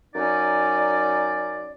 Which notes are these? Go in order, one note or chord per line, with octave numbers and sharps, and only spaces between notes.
F#2 C#4 D#4 D5